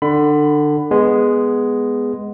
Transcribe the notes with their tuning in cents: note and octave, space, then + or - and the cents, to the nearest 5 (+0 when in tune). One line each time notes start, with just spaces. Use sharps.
D3 +25 B5 +20
G#3 +0 B3 +0